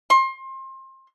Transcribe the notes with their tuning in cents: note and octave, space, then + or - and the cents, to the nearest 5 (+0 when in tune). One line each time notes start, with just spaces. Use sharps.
C6 +30